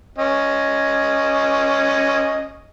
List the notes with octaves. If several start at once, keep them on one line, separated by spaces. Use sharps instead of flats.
C#4 D#5